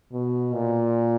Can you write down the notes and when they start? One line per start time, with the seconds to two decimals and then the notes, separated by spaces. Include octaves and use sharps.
0.13 B2
0.53 A#2